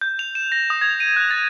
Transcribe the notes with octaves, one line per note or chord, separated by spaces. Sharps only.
G6
F7
E7
A#6
D#6
G#6
D#7
F#6
A6